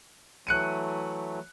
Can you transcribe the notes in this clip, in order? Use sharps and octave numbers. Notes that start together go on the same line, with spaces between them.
E3 F#3 A3 F#6 C#7 D#7